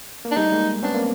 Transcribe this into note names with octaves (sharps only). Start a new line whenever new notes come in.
A#3
D4
G3 A3 D#4
G#3 A#3
B3 C#4 D4
A#3 C4